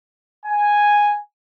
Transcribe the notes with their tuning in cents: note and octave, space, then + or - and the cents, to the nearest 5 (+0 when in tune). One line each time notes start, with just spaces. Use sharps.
G#5 -5